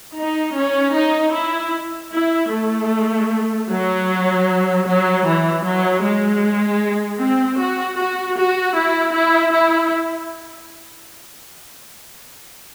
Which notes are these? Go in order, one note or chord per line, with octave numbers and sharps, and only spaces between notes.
D#4
C#4
D#4
E4
E4
A3
F#3
F#3
E3
F#3
G#3
C4
F#4
F#4
F#4
E4
E4
E4